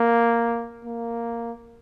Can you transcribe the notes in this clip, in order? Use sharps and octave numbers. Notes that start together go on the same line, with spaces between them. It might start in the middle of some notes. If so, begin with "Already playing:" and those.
Already playing: A#3
A#3